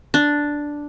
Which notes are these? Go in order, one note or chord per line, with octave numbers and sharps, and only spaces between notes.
D4